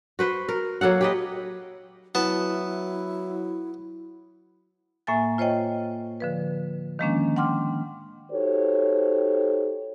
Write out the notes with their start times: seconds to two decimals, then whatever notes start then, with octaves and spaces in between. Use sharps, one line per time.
0.19 F#4 B4 C5
0.49 A#4
0.81 F#3 A#3 A4 F#5
1.01 G4 B4 D#5
2.15 F#3 B3 E4 A5
5.07 A2 A#3 E5 G#5 A6
5.38 F4 C5 C#5 D#5 G5
6.20 D3 F3 B4
6.99 D#3 F3 G#3 A#3 C#4 D4
7.36 F#5 G5 C6 D6 F6
8.31 D#4 F#4 G4 A4 C5 C#5